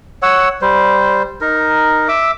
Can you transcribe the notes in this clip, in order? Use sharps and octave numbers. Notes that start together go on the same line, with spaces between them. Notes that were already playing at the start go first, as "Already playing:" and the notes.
C#5 F#5 E6
G3 C5
D#4 A#4
E5 D6 E6